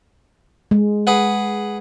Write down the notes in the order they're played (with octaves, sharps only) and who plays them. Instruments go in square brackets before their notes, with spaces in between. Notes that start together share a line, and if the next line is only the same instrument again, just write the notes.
[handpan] G#3
[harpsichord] G#4 B4 F#5